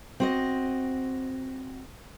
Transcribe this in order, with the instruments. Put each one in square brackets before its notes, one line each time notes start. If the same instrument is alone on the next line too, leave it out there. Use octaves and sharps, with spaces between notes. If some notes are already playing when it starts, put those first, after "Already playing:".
[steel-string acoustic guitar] C4 F#4 D#5